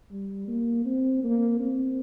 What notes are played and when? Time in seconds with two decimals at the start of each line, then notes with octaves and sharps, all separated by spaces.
0.11 G3
0.48 A#3
0.85 C4
1.24 A#3
1.60 C4